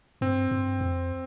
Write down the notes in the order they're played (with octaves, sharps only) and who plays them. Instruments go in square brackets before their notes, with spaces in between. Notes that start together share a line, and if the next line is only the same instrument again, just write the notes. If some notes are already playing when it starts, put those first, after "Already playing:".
[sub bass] G2 [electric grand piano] C4
[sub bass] G2
F2